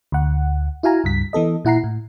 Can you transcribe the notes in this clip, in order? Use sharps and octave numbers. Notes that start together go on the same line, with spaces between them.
D2 F#5
E4 F#4 F5 G#5 A#5
C#2 G2 B6
E3 B3 A4 D#5
A#2 E4 F#5 A#5 C7
A2